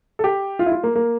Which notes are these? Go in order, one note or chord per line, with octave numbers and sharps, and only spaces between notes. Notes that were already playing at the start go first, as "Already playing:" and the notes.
A4
G4
F4
E4
F4
A#3
A#3